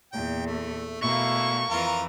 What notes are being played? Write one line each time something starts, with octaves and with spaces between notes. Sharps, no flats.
E2 A#2 G5
A3
B2 A3 A#3 E4 C#6
F2 E3 F4 A#4